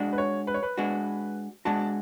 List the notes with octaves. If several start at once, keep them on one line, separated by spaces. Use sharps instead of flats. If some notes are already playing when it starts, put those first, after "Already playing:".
Already playing: G#3 D4 F#4
B4
C#5
B4
C#5
B4
G#3 D4 F#4
G#3 D4 F#4 A5